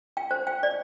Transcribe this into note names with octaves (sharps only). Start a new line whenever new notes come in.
G5
C5
G5
D5